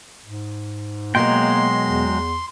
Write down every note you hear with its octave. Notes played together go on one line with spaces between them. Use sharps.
G#2
B2 F#3 G#3 A#3 A#4 G5 C6
E2